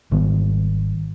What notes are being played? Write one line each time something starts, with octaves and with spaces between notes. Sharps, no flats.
G#1 D#3 G3 B3